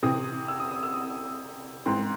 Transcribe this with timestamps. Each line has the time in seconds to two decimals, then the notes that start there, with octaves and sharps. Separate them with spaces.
0.03 C3 E3 C4 D#6
0.48 E6
0.60 D#6
0.71 D#6
0.83 E6
0.94 D#6
1.86 G#2 E3 C4 C6